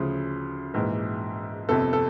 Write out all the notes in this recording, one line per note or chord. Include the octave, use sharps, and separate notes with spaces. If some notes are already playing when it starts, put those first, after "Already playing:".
Already playing: D2 C#3 F3
A#1 G#2 E3
G1 F2 C3 A4
A4